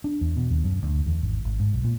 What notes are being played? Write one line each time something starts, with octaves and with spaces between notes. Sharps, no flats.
D4
E2
B2
D#2
F#2
D2
E2
G#1
G#1
G#2
B1
A#2